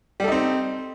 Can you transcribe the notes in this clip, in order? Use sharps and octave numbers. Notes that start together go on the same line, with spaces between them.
G3 C4 D#4 A4